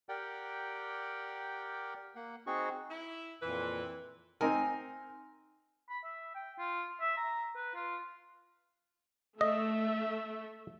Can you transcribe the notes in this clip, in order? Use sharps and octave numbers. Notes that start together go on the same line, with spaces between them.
G4 A#4 D5 F#5 G5
A#3 F#5
C4 D#4 F#4 G#4 C#6
E4
F2 A#2 E3 B4
C4 D#4 A#4 G#5
B5
E5
G5
F4
E5
A#5
B4
F4
A3 D#5 E5